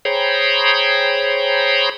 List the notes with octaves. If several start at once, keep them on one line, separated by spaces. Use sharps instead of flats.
G#4 C5 C#5 G5 A#5 B5